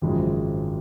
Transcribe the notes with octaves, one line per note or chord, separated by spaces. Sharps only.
G#1 F#2 C#3 F3 G#3